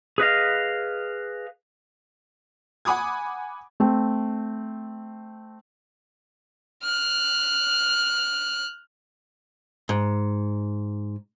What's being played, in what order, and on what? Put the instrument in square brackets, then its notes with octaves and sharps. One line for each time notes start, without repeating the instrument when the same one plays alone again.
[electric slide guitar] G#4 B4 D#5 F5
[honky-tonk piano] F#5 G#5 B5 D6 D#6 G#6
[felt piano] A3 C4
[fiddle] F6 F#6
[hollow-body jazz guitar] G#2